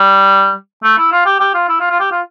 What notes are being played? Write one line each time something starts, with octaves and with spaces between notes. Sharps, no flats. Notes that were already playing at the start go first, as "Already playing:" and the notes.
Already playing: G3
A3
E4
F4
G4
G4
F4
E4
F4
F4
G4
F4